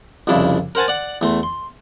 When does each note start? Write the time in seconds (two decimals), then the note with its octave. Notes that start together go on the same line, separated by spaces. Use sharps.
0.27 C2 F2 C#3 D4 E4
0.75 A#4 C5 F#5 G#5 A5
0.88 D5 F#5
1.21 E2 A3 C6
1.43 C6